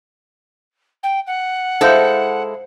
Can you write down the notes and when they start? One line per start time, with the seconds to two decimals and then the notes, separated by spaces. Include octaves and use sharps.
1.03 G5
1.27 F#5
1.81 G#3 E4 A4 C5 F5 G6